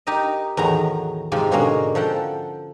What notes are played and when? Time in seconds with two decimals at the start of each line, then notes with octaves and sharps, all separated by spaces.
0.07 D#4 G4 A#4 D#5
0.57 E2 A2 D#3 F#3 A#5
1.32 G#2 C3 F3 C4 F4
1.51 G#2 B2 D3 G#3 A#3 C#4
1.95 F3 A4 F#5 G5